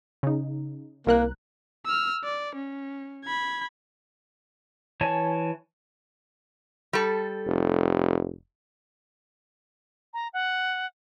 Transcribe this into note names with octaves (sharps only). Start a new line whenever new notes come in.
C#3 D#4
C2 A#3 A#4 F#6
E6 F6
D5
C#4
B5 G#6
E3 C#5 G#5 A5
G3 A4
F1
A#5
F#5